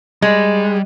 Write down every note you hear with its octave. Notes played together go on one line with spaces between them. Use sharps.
G3 G#3